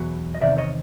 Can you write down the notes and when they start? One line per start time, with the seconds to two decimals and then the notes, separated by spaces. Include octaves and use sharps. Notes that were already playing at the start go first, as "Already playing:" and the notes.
Already playing: E2 B2 F#3
0.35 D#5
0.41 E2 C3 D#3 D5 E5
0.58 C#5 D#5